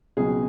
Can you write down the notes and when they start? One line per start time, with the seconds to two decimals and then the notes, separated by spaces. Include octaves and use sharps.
0.17 C#2 B2 F#3 G#4